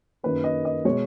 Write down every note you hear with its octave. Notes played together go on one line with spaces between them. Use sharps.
F#2 D#3 A#3 B4
D#5
D#5
B2 G#3 C#5